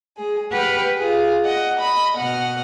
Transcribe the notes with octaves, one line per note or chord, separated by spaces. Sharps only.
G#3 G#4
G4 B4 F#5 G5 F6
F4 G#4
D#5 F#5
D#5 B5
B2 D#5 F#5 F6